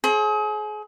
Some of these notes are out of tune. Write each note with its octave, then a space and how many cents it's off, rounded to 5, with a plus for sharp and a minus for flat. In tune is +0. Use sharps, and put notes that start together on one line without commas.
G#4 +35 C5 +45